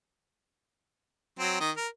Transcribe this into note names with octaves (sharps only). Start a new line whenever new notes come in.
F#3 C4
D#3 D#5
A#4